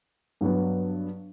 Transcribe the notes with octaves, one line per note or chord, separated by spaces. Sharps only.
G2 F#3 B3